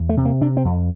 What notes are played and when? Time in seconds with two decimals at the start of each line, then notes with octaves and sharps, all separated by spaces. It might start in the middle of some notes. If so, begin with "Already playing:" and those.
Already playing: E2
0.09 A3
0.17 C3
0.25 A#3
0.41 C3 D4
0.57 C4
0.65 F2